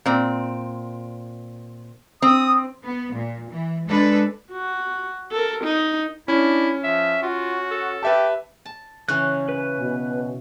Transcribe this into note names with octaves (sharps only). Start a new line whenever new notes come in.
A#2 C4
C4 D#6
B3
A#2
E3
G#3 D4 A4 B4
F#4
A4 A#4
D#4
C#4 D4 E4
F3 E5
F4 F#4
A4
G4 B4 E5 A5
A5
C#3 E3 C#4 F#6
B4
B2